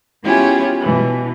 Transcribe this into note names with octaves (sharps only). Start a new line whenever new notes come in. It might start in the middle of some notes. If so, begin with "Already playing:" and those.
B3 C#4 E4 F4 G4 G#4
B2 E3